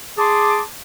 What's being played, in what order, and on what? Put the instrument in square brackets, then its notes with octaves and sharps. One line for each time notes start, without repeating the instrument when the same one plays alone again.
[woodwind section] G#4 A5 C6 D6